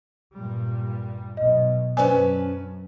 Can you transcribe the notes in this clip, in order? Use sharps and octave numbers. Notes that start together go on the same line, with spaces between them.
G2 A#2 G3
B1 B2 D#5
F#2 C#4 B4 C5 D5 G#5 A5